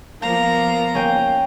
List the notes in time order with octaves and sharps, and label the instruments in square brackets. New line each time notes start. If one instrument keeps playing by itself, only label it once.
[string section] F3 A#3 B3 [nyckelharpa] A#4 A#5 [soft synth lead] F5
[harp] C#4 G5